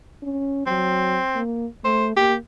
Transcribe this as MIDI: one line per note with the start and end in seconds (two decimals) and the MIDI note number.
0.23 0.66 61
0.66 1.20 54
0.66 1.39 60
1.36 1.67 58
1.84 2.13 57
1.84 2.06 72
2.16 2.37 58
2.16 2.34 67